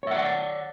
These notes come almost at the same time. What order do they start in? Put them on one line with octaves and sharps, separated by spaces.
C#5 E5 F#5 D5